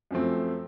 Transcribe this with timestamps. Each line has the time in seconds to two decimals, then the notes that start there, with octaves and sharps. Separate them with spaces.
0.11 F#2 F3 A3 C4